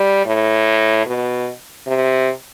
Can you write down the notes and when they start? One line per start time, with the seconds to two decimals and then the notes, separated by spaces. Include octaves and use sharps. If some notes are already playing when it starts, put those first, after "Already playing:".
Already playing: G3
0.25 A2
1.06 B2
1.87 C3